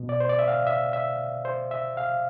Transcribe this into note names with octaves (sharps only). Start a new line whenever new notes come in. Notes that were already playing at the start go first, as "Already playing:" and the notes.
Already playing: B2
D5
C5
D5
E5
F5
E5
E5
C5
E5
F5